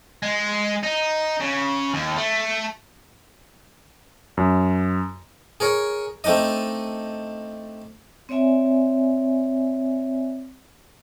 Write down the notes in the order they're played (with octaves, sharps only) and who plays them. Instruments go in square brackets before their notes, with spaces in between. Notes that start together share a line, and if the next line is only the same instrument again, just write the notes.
[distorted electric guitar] G#3
D#4
C#3
D#2
A3
[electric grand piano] F#2
[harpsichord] G#4 A#4 C#5
A3 C4 D4 D#4 D#5
[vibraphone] C4 C#5 D5 E5 G#5